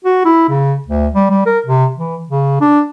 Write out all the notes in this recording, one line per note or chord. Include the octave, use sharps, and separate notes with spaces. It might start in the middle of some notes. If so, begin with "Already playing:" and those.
F#4
E4
C#3
D2
G3
G3
A#4
C3
E3
C#3
D4